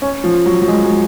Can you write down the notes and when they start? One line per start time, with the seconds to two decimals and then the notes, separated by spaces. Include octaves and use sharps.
0.02 C#4
0.24 F3
0.46 F#3
0.62 F#3
0.68 G#3
0.84 F#3